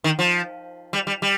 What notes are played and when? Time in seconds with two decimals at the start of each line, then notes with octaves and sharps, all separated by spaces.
0.04 D#3
0.19 F3
0.93 G3
1.07 G3
1.22 G3